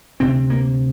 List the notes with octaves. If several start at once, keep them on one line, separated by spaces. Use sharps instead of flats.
D2 C3 C4
A#3